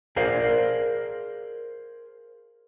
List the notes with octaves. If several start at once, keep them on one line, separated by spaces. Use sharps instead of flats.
G#4 A#4 C5 D5 F5